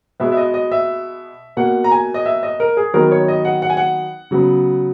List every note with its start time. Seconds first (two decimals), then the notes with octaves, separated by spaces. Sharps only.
0.20 B2 G#3 B3 E5
0.32 E5
0.37 D#5
0.54 D#5
0.71 E5
1.57 B2 A#3 F#5
1.84 A#5
1.91 G#5
2.14 D#5
2.26 E5
2.43 D#5
2.60 A#4
2.77 G#4
2.94 D#3 F#3 B3 A#4
3.11 C#5
3.28 D#5
3.45 F#5
3.62 F#5
3.70 G#5
3.77 F#5
4.31 C#3 F#3 B3